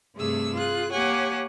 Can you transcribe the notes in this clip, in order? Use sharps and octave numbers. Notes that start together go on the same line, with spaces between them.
G2 C3 A3 G#4 E6
F4 G#4 F#6
A#3 G4 C#5 F#5 G#5